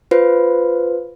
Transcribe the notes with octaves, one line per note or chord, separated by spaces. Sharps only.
F4 B4 C5